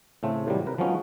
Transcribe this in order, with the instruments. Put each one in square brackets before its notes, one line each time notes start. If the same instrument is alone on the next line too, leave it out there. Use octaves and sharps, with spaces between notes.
[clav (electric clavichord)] A2 C#3 A3 C4
A2 C3 D#3 F#3 G3
C3 A#4 B4
F3 F#3 G#3 B3 C#4 D#4